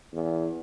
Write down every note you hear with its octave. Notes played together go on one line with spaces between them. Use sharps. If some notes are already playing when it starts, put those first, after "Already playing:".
E2